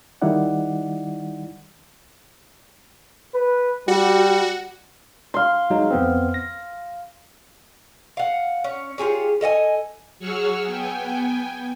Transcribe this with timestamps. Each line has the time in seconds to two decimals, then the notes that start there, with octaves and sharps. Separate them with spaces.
0.22 D#3 G3 D#4 E4 D5 F#5
3.35 B4
3.88 G3 F#4
5.34 F5 C6
5.70 F#3 G#3 D#4
5.90 F2 B3 C4
6.34 A#6
8.17 F5 F#5
8.64 C#4
8.98 F4 G4 G#4 C#5
9.41 A4 D#5 F#5 G#5
10.19 F#3 G#4 F#5 C#6 E6 F6
10.66 B3 G5 G#5